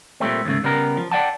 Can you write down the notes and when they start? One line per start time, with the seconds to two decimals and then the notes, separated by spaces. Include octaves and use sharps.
0.20 A#2 G3 A3 C4
0.45 D#2 G#2 C#3 A3
0.64 C#3 G3 B3 A#4
0.97 F3
1.11 D5 E5 F#5 G5 A5